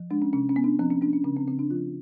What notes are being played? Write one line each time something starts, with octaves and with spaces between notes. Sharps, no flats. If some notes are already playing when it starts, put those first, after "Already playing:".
Already playing: F3
G#3 D4
C#4
C3 C#4
C#4
B3
D4
F3 C4
C#4
A#3 D4
C#4
C#3 C#4
C4
C#3 C4
D4
F3 F4